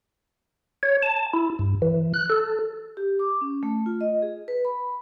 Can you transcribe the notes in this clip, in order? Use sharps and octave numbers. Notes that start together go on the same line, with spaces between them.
C#5
A5
E4
G2
E3
F#6
A4
G4
D6
C#4
A3
F4
D#5
G#4
B4
B5